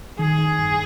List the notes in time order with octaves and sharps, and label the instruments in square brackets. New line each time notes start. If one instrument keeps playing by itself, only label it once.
[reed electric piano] D#3 [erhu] G#4
[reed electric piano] D#3
G2